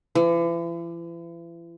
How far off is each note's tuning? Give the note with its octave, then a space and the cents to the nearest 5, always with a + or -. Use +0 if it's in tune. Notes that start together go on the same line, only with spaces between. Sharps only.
E3 +40